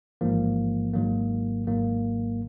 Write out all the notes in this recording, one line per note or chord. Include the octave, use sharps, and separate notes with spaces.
A1 G#2 F3 A#3
G#1 G#2 D#3 F#3 A#3
G#1 G#2 D#3 F#3 A#3